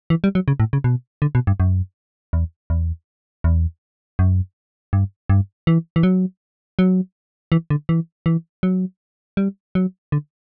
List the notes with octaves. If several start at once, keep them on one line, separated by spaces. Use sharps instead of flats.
E3
G3
F#3
C#3
A2
C#3
B2
D3
B2
G2
F#2
E2
E2
E2
F#2
G2
G2
E3
E3
F#3
F#3
E3
D3
E3
E3
F#3
G3
F#3
D3